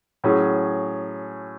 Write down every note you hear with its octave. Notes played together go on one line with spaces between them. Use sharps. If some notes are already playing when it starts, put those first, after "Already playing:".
A2 F#3 C#4 G#4